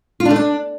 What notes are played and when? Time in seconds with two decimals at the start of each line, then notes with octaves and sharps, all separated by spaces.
0.20 F4
0.25 D4
0.31 A3
0.36 D4